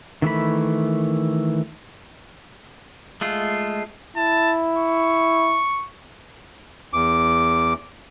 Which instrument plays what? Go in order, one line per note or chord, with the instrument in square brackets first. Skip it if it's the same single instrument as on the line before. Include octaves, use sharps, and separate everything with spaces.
[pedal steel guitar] D#3 E3 A3 B5
G#3 A3 F4
[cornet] E4 [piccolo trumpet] A5
[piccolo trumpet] C#6
[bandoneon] E2 D6